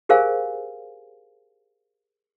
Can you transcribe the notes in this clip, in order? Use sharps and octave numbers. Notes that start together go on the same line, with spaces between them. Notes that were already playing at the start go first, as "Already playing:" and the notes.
G4 G#4 A#4 C5 F5 G#5